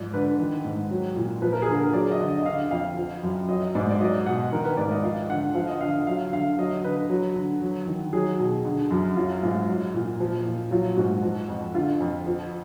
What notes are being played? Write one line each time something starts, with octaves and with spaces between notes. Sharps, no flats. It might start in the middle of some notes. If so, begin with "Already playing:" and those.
Already playing: G#2 F3 D5
D3 B4
D#3
G#2
F#3
A#2
F3 B4
A#4
G#4
D3 A#4
F#3 D5
D#5
D3
D#5
D#5
D3 F5
F2 F5
F3
F#2
F#3 D#5
G#2 D5
D5
F#3 D#5
B2 F#5
D#3 A#4
B4
G#2 D5
D#5
F3 F5
D3 F#5
F3 F5
D#5
D3 F5
F#3 F5
D3 F5
F#3 D#5
D3 B4
F#3
D3
F#3
D#3
F#3 G#4
B2
D3
F#2
F#3 F4
G#2 F4
F#3
A#2
F3
A#2
F#3 F4
G#2 F#4
F3
F2
D3 F4
F2
F3